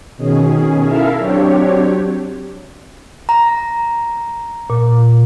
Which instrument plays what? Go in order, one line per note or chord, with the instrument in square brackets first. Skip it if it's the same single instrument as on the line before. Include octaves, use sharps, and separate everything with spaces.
[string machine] B2 D#3 C#4 G#4
E4 A4 A#4 E5 F5
F#3 C4 D4 G4 C#5
[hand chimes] A#5
[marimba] A#2